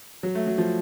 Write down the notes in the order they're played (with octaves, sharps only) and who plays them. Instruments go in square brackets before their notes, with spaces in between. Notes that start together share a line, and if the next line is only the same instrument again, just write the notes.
[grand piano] F#3
A3
F#3
F3